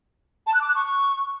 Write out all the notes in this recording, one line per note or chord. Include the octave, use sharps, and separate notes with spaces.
A5
F#6
D6
F#6
C#6